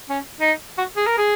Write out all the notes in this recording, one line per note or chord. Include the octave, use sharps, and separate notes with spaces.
C#4
D#4
F#4
G#4
A#4
G#4